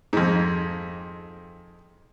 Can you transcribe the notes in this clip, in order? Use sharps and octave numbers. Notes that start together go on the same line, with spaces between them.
F2 G#2